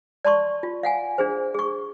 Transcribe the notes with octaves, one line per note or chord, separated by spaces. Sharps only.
D5 A5 C6 C#6
F4
F5 F#5 G#5
D4 G#4 C5
G#4 C#6